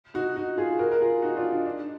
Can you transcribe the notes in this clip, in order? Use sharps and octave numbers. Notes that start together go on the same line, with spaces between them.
D#4 F#4
D#4 F#4
F4 G#4
F#4 A#4
A#4
F4 G#4
D#4 F#4
D4 F4
D#4
D4